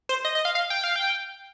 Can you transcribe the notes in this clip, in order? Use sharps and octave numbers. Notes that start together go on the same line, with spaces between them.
C5
D#5
D#5
F5
F5
G5
F5
G5